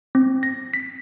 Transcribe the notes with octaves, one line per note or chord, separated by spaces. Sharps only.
C4
A#6
B6